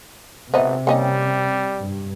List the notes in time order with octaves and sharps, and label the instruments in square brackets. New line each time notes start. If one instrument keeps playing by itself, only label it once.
[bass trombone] G#1 [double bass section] C3 [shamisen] B3 D#4 [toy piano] C5 E5
[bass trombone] G3 [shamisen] A#3 C#4 D#4 [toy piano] G5
[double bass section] G2